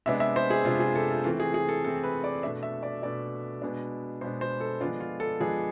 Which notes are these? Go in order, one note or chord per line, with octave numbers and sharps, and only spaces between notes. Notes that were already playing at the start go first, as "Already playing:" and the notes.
C3 G#3 B3 D4 E5
E5
C5
G#4
C3 G#3 B3 D4 F4
G#4
A4
F4
E3 A3 C4 F4
G#4
G#4
A4
E3 A3 C4 A4
B4
D5
B2 A3 D4 E5
E5
D5
B2 A3 D4 D5
B2 G#3 B3 D4
B2 G#3 B3 D4 C5
C5
A4
D3 F3 G#3 B3 D4 F4
F4
A4
D3 F3 G#3 B3 D4 G#4